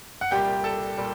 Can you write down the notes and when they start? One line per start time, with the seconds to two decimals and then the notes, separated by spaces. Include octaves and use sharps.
0.21 F#5
0.31 C2 A#2 G3 G4 G5
0.64 A4 A5
0.98 A#2 G3